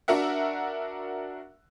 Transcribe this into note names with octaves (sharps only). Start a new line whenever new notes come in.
D4 F#4 A#4 E5 F#5